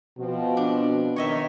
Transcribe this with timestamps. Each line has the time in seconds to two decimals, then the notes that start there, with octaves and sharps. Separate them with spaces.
0.18 B2 F3 C4 F#4
0.57 D4
1.16 D#3 C#5 D#5 E5